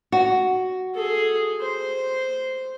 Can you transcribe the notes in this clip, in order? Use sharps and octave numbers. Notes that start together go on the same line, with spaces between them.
F#4
G#4 A4
C5